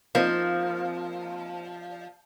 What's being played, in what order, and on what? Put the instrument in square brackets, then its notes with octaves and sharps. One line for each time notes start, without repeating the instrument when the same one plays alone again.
[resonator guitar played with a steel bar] F3 [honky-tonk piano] A#3 C4 D#4